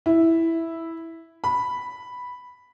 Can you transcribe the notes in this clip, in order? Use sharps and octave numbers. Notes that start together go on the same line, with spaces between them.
E4
B5